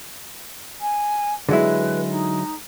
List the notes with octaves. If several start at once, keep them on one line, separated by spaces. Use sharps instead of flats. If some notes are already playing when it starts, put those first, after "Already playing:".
G#5
D3 F#3 G#3 E4 B4
D#4